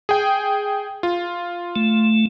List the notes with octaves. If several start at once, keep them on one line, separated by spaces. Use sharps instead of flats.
G#4 G5
F4
A3